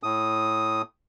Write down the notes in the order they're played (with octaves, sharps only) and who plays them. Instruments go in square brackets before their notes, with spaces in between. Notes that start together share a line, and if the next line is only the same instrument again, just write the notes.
[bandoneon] A2 D#6